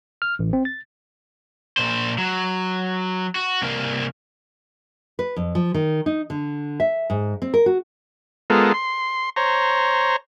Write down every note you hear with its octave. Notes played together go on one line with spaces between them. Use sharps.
F6
A1
C4
A6
A#2 C5
F#3
F#4
C2 A#3
B4
F2
F3
D#3
D#4
D3
E5
G#2
C4
A#4
F#4
G#3 B3 F4 A4 A#4
C6
C5 C#5 A#5